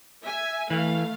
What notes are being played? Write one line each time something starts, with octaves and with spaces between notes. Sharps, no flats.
E5 G#5
E3 A3 F5